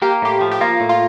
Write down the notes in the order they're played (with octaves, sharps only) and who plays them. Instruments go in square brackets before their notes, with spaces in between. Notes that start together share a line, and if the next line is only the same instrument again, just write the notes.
[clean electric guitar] A#3 [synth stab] G4
[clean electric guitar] A2 [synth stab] G4
[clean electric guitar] F3
[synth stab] G4
[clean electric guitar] A#3 [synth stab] F4
[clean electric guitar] A2
[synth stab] F4